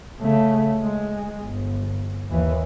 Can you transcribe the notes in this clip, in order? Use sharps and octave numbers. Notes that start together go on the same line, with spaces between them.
C#3 A3
G#3
G1
D#2 E3